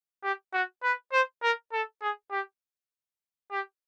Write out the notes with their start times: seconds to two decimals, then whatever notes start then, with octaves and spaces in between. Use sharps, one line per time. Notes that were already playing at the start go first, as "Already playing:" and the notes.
0.23 G4
0.53 F#4
0.83 B4
1.12 C5
1.43 A#4
1.73 A4
2.01 G#4
2.31 G4
3.51 G4